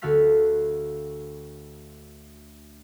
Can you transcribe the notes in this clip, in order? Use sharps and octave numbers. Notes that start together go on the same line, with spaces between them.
D2 D3 F#4 A4 F5 B6